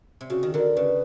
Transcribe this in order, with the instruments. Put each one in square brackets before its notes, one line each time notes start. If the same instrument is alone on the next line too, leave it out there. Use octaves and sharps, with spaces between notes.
[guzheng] C3
[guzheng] C#3 [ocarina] F#4
[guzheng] D#3
[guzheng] D3 [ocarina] A#4
[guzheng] C#3 [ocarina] B4